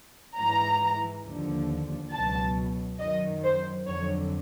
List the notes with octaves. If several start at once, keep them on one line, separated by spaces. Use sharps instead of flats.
G#2 E3 A#5
D#2 D3 F3
C#2 B2 F#3 A5
F#2 D#3 F#3 D#5
C5
F2 D3 F#3 C#5